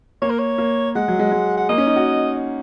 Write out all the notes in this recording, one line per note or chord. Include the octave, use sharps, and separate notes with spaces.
A#3 C#5
A#4
C#5
A#3
G#3 F#5
F#3
G#3
G#3
F#5
A#3 D#5
C#4
D#4
F#4